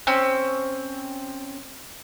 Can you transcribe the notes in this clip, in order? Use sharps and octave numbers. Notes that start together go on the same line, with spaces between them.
C4 C#4 E6